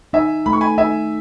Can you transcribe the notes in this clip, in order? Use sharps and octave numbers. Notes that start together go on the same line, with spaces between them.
D#4 E5 G#5
A3 B5
C#6
G#5 B5
D#4 E5 G#5